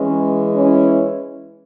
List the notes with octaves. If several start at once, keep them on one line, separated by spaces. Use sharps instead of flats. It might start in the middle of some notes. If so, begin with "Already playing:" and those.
Already playing: E3 G#3 C#4
C#4 E4